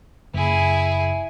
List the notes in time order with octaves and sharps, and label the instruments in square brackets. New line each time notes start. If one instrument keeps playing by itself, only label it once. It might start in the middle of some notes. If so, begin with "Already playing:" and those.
[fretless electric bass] F#1 [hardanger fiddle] E4 G#4